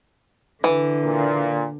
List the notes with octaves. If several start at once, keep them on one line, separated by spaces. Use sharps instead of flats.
D3 E3
A#2